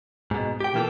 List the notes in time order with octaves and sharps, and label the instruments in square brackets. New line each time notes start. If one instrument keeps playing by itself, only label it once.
[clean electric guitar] G#2 B2
G4 G5
B2 E3 A#3 F4 A4 G5